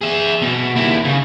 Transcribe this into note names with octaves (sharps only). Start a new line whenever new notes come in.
G#4 E5
B2
D#2 E4
C#3